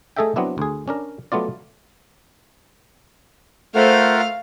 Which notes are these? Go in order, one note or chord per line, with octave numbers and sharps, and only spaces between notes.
A3 G#4 A4 D#5 E5 G5
F#3 B3 C4 D4 E4
D2 G#4
C#4 D4 A#4
F#3 A3 B3 F4 D5
A3 F4 A#4 C5 F5 F#5